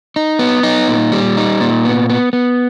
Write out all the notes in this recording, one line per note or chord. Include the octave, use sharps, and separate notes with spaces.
D#4
B3
D#4
A#2
G3
D#4
A#2
B3
B3
B3